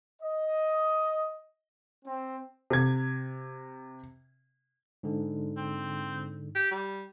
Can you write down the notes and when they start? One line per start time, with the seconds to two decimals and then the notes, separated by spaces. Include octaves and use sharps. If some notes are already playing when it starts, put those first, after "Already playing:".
0.22 D#5
2.05 C4
2.70 C3 G#6
5.03 G#2 D3
5.57 C4
6.55 G4
6.71 G3